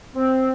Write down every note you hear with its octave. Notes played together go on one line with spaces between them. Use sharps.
C4